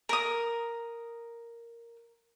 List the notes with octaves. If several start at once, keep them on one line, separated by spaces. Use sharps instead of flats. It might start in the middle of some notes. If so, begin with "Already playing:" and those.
A#4 D#6